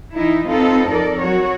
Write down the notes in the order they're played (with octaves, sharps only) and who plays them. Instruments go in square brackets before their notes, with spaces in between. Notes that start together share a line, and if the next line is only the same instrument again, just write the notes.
[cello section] E3 D#4 E4
C4 D#4 F4 A4 B4
F2 A4 A#4 D5
F#3 F#4 C#5